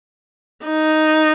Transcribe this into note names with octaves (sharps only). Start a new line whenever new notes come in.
D#4